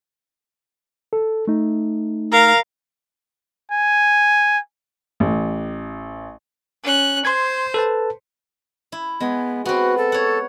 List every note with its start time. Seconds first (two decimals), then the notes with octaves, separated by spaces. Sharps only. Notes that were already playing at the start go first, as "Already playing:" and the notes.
1.13 A4
1.47 A3 D#4
2.32 A#4 F5
3.71 G#5
5.20 A1
6.83 C#4 F#6
7.25 C5 C6 G#6
7.74 A4 B4 A5
8.92 E4
9.20 G#3 B3
9.65 B3 C4 F#4
9.98 A4
10.12 C#5 F#5